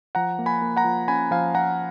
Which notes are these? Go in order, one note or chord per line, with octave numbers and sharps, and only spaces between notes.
F3 F#5 A#5
A#3
G#5 B5
A#3
F#5 A#5
F3
C#4 G#5 B5
F3 F5 G#5
F3 F#5 A#5